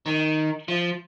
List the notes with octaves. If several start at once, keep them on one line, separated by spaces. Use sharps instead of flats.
D#3
F3